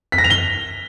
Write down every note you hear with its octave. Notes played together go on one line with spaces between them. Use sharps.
B6
A#6
F7
G7